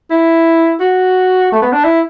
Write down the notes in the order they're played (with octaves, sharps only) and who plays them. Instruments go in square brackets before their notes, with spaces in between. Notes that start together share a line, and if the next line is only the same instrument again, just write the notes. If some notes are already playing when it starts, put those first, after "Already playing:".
[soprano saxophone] E4
F#4
A3
B3
D4
E4